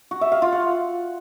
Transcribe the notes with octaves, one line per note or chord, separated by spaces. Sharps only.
F#4
E5
F5
F4
F#5